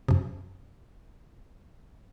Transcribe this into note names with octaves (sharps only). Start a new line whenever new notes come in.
F#2 C3